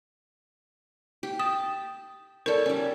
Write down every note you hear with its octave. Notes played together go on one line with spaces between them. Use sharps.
G4
A5 D#6
A4 A#4 C#5 D5
G3 C#4